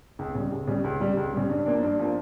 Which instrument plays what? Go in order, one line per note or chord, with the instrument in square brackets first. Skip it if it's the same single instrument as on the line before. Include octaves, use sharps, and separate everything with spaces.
[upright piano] C#2
C#3 G3
C#2
C#3 G3
C#2
C#3 G3
C#2
C#3 G3
G2
F3 A#3 D4
G2
F3 A#3 D4